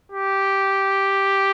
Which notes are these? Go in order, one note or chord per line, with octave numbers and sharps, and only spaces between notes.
G4